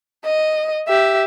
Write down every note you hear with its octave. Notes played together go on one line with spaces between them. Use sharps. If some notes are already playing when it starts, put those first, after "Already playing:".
D#5
G4 E5